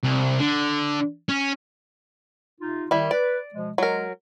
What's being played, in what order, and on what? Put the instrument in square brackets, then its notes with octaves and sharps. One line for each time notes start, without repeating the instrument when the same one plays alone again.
[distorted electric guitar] C2
D3
C#4
[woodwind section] C3 D#4 F4
[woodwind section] D#3 [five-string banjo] G3 E4
[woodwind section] B4 [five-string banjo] D5
[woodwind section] B2 F3 G#3
[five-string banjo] F#3 A#4 [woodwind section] G#3